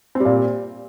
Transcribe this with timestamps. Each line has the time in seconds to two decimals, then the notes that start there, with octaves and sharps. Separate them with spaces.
0.15 C4
0.20 G3
0.25 A#2